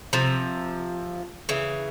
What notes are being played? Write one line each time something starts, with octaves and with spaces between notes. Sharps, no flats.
C3 F3
C#3 E3